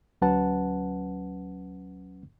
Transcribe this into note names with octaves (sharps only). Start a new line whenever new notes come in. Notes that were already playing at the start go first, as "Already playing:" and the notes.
D2 F#3 C#4 B4 F#5 A5